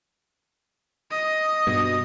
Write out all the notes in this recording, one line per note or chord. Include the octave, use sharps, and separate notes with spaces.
D#5
G2 B2